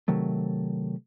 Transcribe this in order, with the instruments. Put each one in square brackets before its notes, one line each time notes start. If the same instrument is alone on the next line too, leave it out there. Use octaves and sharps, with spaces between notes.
[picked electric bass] C3 D#3 F#3 A3